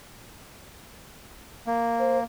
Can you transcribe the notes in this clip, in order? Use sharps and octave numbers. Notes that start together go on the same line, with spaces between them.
A#3
C5